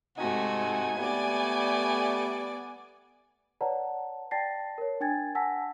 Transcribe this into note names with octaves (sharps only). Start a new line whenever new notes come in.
G#2 C3 A3 D#4 F#4 G#5
G3 A3 B3 D5
B4 C#5 D5 F#5 A5 A#5
D5 G5 A5 A6 A#6 C7
A#4 C#5
D4 G5 G#5 G#6 A6
F#5 G#5 A5 E6 A#6 B6